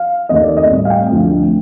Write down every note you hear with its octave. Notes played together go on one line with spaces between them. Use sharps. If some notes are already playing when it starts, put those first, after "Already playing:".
Already playing: F5
D#2 D#3 A3 C4 D#5
D5
D#5
A2 G3 C4
F5
G5
D2 D3 F3 A3 C4